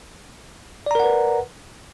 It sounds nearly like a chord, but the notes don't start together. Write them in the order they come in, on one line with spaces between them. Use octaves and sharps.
D5 A#5 A#4 F#5 B4